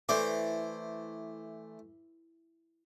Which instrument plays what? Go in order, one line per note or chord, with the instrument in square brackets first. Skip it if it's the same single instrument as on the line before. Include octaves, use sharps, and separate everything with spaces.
[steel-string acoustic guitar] E3 [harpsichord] A3 C5 D5